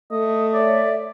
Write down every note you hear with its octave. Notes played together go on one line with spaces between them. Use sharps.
A3 D#5
C#5 D5 E5